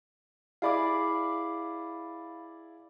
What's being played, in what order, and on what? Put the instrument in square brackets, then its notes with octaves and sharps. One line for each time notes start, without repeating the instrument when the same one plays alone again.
[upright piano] E4 G#4 D5 [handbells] F5 B5 D6